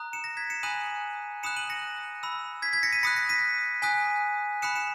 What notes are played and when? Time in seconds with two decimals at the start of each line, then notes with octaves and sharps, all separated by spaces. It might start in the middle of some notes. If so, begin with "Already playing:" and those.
Already playing: A#5 D#6 F#6
0.13 C#7 E7
0.24 A#6
0.37 G#6 B6
0.50 C#7 E7
0.63 G#5 B5 D#6 F#6 D#7 F#7
1.43 B5 D#6 F#6 C#7 E7
1.56 D#7 F#7
1.70 A#6 C#7
2.23 B5 E6
2.62 G#6 B6
2.73 G#6 B6
2.83 A#6 C#7
2.92 B6 D#7
3.03 B5 D#6 F#6 A#6 C#7
3.16 A#6 C#7
3.29 B6 D#7
3.82 G#5 D#6 F#6 B6 D#7
4.62 B5 D#6 F#6 C#7 E7
4.75 C#7 E7